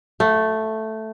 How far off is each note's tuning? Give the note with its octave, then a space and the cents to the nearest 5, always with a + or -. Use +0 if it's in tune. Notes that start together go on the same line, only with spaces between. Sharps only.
A3 +0 F5 +45